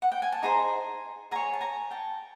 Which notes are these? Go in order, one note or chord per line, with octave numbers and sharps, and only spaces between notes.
F#5
G5
G#5
A5
D#4 G#4 C5 G#5 A#5
G#4 C#5 G#5 A#5
A5
G#5 A#5
G5 A5